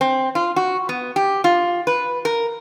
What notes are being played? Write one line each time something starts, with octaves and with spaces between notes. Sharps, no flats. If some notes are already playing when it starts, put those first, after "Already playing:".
C4
F4
F#4
B3
G4
F4
B4
A#4